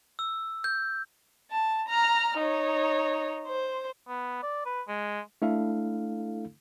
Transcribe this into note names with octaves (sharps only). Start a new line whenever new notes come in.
E6
G6
A5
A#5 F6
D#4 C#5
C5
B3
D5
B4
G#3
A3 D4 E4 A4 F5